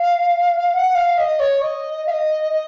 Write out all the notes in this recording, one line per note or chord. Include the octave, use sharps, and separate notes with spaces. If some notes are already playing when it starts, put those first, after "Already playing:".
Already playing: F5
F#5
F5
D#5
C#5
D#5
F5
D#5
D#5